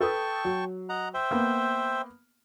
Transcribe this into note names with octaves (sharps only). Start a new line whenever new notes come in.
A4 B4 G5 A5 C#6 D#6
F#3
D#5 F#5 A#5
C5 E5 G5
A#3 B3